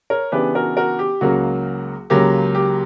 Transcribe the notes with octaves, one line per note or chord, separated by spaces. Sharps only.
A#4 C#5
C#3 E3 B3 D4 G4 B4
F#4 A#4
F#4 A#4
G4
C#2 C#3 F#3 A#3 F#4
C#2 C#3 F#3 A#3 G4
G4